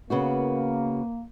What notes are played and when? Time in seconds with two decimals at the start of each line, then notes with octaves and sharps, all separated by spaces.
0.10 C#3 A#3 B3 F#4